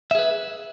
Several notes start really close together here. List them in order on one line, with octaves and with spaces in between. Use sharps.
E5 G#4 B4